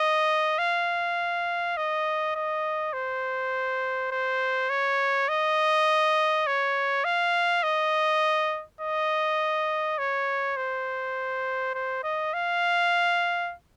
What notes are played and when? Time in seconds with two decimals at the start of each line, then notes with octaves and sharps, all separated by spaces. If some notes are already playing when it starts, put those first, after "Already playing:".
Already playing: D#5
0.58 F5
1.77 D#5
2.35 D#5
2.93 C5
4.12 C5
4.70 C#5
5.29 D#5
6.47 C#5
7.04 F5
7.63 D#5
8.81 D#5
9.98 C#5
10.57 C5
11.75 C5
12.03 D#5
12.34 F5